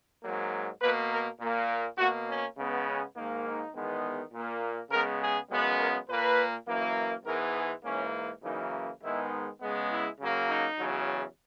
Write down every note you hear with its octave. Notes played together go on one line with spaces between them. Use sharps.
G#2 F#3 A#3
B2 A#3 B4
A#4
A#2 A#3
B2 A#3 F#4
C#4
C#3 G#3 B3
C#4
G#2 D#3 A#3
D#4
E2 D#3 G#3 B3
A#2 A#3
C#3 G#3 B3 A#4
G#4
F#2 C#3 G#3 B3
A#4
A#2 A#3 B4
F#2 E3 A#3
G#2 E3 G#3 B3 A#4
G#4
G#2 E3 A#3 C#4
F#2 C#3 E3 A#3 D#4
G#2 D#3 G#3 B3 E4
C#3 G#3 B3
E4
C#3 F#3 A#3
D#4
E2 C#3 F#3